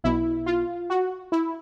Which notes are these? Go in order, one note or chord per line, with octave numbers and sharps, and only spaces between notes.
B1 B2 E4
F4
F#4
E4